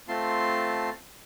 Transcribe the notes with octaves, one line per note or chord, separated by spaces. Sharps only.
A3 C4 F4 A5 C6